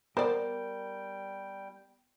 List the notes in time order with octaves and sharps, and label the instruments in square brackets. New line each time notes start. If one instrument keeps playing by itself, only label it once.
[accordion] G3 G5 [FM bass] B3 [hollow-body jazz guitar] A#4 [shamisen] C5 D5